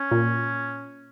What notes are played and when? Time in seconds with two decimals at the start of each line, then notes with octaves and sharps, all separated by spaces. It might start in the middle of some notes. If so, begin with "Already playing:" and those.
Already playing: C#4
0.11 A#2